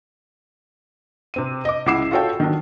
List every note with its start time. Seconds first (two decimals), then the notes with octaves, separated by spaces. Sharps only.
1.34 C3 C4 D#7
1.65 D#5 D6
1.86 C#2 E4 F#5 D6 C7 E7
2.11 F4 F#4 A4 C#5 G5
2.40 D#3 F#3 D4